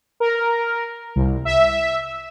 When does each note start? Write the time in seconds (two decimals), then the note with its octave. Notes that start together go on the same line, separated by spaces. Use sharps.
0.20 A#4
1.16 C2
1.45 E5